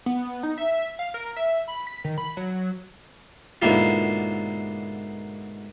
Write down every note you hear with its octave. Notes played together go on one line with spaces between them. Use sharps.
B3
D#4
E5
F5
A#4
E5
B5
B6
D#3
B5
F#3
G#2 B2 D3 A#3 E4 F4